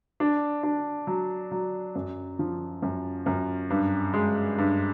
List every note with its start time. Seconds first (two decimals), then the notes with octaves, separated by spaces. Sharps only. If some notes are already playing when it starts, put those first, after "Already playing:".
0.20 D4
0.63 D4
1.07 F#3
1.51 F#3
1.95 F#2
2.39 F3
2.82 F#2
3.26 F#2
3.70 G2
4.13 G#3
4.58 G2